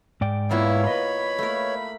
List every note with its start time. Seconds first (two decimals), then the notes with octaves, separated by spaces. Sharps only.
0.21 G#2 D5 G5
0.51 A#3 B3 E4 F4 C#5
0.87 B4 D#5 B5
1.39 A3 A#3 A#4